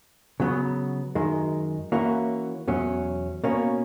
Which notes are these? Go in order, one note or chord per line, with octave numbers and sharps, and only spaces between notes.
C#3 F#3 B3
F#2 D#3 G#3
E3 A#3 C#4 F#4
E2 B2 F#3 C#4
B2 A#3 C#4